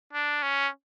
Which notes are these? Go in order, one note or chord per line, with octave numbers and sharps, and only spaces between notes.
D4
C#4